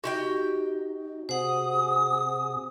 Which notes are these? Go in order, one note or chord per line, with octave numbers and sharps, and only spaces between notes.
D#4 F#4 G4 G5
C3 G#4 C5 F#5 D#6